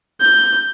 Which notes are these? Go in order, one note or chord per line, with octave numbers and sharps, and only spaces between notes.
G6